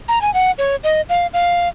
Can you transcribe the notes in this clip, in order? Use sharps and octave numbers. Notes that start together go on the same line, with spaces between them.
A#5
G#5
F#5
C#5
D#5
F5
F5